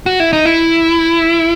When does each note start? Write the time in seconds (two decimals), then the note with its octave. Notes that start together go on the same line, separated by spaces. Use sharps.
0.06 F#4
0.20 E4
0.33 D#4
0.45 E4